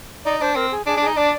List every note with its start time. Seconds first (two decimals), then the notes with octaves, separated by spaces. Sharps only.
0.25 D#4 D5
0.41 D4 C5
0.55 C4 A#4
0.71 G#4
0.86 D4 G#4
0.97 D4 G#4
1.06 D#4
1.17 D4 D5